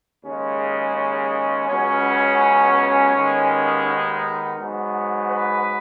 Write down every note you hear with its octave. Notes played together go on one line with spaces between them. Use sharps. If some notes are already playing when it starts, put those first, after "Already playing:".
D#2 C#3 G#3 C#4
C#4
C#2 B2 F#3 B3 C#4
D#2 D#3 G#3 B3
D#4
G#2 F#3 B3
B4